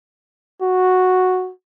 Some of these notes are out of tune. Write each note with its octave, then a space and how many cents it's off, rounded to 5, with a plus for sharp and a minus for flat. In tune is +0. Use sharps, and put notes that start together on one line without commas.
F#4 -5